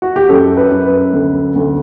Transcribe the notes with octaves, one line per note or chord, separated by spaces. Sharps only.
F#4
G4
F#2 A4
B4
F#2
B4
D2
D2